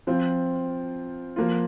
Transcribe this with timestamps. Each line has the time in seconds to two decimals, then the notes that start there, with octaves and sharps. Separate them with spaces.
0.07 F3 C4 F4
1.36 F3 A#3 F4